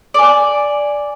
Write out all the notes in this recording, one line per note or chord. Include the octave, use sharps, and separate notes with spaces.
D5 G#5